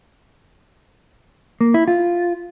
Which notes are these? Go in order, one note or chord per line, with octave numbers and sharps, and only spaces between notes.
A#3
E4
F4